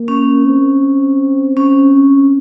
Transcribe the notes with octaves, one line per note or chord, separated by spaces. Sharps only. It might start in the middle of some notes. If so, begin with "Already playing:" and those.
Already playing: A#3
C#4
C4
C#4
C4